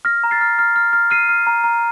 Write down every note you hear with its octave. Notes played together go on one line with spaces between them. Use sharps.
F6 A#6
A#5
A6 C7
F6
F6
F6
F6
F6 C7 D#7
F6
A#5
A#5